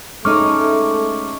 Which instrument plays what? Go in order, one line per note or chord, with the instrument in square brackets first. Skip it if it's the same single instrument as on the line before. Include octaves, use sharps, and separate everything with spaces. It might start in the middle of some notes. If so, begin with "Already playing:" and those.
[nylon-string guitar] G#3 C#4 D#4 [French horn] A3 [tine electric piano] C#6 D6 F6